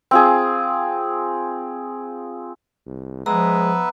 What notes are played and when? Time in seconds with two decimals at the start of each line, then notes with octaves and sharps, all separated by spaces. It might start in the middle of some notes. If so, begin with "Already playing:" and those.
0.11 C4 F4 G#4
2.87 C2
3.26 F3 G#3 B3 B4 E5 A#5